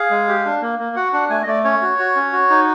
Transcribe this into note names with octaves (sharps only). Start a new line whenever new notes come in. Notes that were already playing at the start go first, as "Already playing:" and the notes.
Already playing: G#4 F5
G#3
G4
D4
A#3
A#3
F#4 F#5
D4 F#5
A3 G#5
D#5
A3 D5
C#4 C#5
F#4
F#4
C#4
F#4
D#4